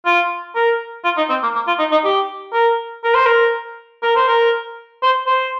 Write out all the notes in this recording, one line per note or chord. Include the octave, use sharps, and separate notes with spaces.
F4
A#4
F4
D#4
C4
A#3
A#3
F4
D#4
D#4
G4
A#4
A#4
C5
A#4
A#4
C5
A#4
C5
C5